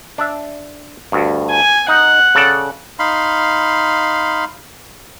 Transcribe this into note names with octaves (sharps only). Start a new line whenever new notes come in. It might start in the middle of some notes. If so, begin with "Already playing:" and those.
D4 D5 E5
D2 G2
G#5
D#4 F#5
C#3 A4 D5
D#4 F5 B5 C6